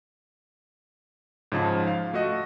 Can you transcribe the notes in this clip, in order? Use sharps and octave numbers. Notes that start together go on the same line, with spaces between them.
G#2 C#3 F3 A5
F5
A3 F#4 D#5